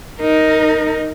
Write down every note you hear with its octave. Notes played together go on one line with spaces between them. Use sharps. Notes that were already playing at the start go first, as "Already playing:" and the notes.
D#4 A#4